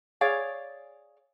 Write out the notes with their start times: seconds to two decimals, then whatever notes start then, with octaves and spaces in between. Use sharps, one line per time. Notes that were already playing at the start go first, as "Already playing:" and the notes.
0.21 G#4 C#5 D5 F5